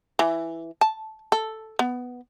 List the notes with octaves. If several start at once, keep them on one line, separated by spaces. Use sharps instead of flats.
E3
A5
A4
B3